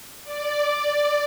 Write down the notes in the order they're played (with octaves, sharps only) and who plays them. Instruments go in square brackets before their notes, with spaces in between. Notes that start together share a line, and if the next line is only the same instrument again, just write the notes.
[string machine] D5